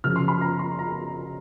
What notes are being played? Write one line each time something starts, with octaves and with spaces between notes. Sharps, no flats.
F#2 C#3 F3 F6
C6
B5
A#5
C6
A#5